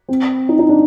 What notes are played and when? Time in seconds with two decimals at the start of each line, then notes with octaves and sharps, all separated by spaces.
0.08 C4
0.49 D#4
0.59 D#4
0.69 D4